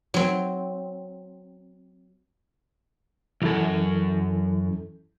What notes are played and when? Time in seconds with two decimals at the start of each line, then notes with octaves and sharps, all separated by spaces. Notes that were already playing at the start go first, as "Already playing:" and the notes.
0.14 F#3 C4
3.42 C2 F#2 E3 E4 A4